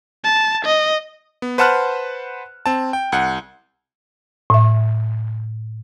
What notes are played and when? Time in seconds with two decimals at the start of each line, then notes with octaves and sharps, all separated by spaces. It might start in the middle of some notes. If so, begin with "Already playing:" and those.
0.24 A5
0.65 D#5
1.42 B3
1.58 B4 C5 F#5 A5 F6 F#6
2.66 C4 A5
2.93 G5
3.12 C2 F#5
4.50 A2 E5